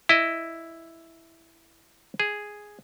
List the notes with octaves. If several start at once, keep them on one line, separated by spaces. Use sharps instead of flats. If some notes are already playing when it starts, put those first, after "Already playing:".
E4 D#5
G#4